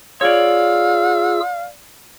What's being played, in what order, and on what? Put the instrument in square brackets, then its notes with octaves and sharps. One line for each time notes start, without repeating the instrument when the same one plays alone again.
[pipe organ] F4 G#4 E6 [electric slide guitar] C#5 D5 [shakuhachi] F5